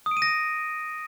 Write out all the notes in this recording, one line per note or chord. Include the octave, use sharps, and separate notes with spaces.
D#6
D7
D#7
A#6
D#7